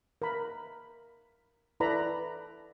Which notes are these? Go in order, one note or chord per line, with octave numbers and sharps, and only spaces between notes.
A#4 B5
E4 A4 B4 D5 A#5 B5